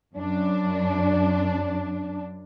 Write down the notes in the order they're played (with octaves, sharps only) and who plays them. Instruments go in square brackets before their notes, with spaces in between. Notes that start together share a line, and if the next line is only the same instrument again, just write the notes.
[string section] F#2 D4